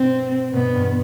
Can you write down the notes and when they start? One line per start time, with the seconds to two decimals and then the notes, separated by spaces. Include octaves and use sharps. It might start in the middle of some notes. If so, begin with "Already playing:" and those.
Already playing: G2 B2 C4
0.53 G2 B2 B3
0.73 E2 G2